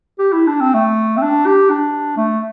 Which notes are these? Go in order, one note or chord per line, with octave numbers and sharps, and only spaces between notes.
G4
E4
D4
C4
A3
C4
D4
G4
D4
A3